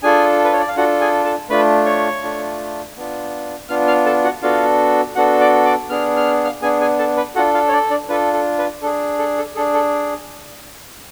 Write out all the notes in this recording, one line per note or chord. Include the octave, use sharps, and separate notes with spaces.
D4 F4 G#4 A4 G#5
B4
C#5
D5
F5
D4 F4 F#4 A4 F#5
G#4 G#5
A4 A5
A3 D4 F4 B4 B5
C#5 C#6
A3 D4 F4
B3 D4 F4
B3 D4 F4 F5 F6
F5 F6
A4 A5
F#4 F#5
B3 D4 F4 F#4 A4 F5
B3 D4 F#4 A4 F#5
D5 D6
D5 D6
B3 D4 G#4 F6
F6
F5 F6
B3 D4 G#4 G#5
G#4 G#5
A4 A5
B4 B5
D4 F4 F#4 A4 F#5
F4 F5
C#5
D4 D5
D4 D5
D4 F4 A4 B4
A4
B4
D4 G#4 A4
A4
A4
D4 G#4 A4
A4